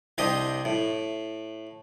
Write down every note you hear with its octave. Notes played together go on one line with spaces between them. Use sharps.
C2 C4 D4 G4 D#5
A2